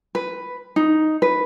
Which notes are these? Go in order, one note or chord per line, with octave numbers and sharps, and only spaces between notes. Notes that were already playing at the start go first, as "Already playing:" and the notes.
B4
D#4
B4